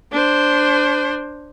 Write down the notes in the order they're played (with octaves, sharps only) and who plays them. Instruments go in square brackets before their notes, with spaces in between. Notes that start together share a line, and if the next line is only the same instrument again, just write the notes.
[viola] D4 C5